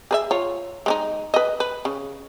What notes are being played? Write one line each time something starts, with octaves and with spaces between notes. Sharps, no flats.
G#4 B4 E5
F4 C#5
G#3 C#4 D#4
B4 D#5
B4
C#3